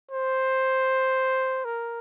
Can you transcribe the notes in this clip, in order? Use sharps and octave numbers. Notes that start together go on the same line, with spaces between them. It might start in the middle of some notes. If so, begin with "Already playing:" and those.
C5
A#4